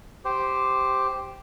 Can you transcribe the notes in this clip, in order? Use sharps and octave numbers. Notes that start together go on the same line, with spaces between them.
G4 C5